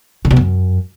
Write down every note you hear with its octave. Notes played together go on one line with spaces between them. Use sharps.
C#3
B2
F#2